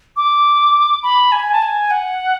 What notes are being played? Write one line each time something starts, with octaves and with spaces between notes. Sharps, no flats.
D6
B5
G#5
A5
G#5
F#5